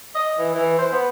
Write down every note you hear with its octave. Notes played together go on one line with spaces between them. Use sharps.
D#5
E3
E3
C5
B3